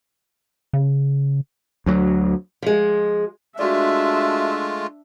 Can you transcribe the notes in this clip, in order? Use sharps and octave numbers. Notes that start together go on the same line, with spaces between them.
C#3
D2 F#3
F3 G#3
G#3 A3 D4 F4 F#4 D5 E5